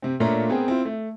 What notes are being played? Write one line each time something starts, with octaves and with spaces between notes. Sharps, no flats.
C3 C4
A#2 A3 D4 F4 C#5 A#5
B3 C4 G#4 A#4 G5
C4 E4 F4
A3